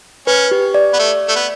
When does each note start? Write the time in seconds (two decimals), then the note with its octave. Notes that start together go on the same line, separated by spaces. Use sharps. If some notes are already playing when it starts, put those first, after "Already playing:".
0.27 C#4 B4
0.51 G4
0.74 D5
0.94 B3
0.99 A3
1.28 A3
1.35 B3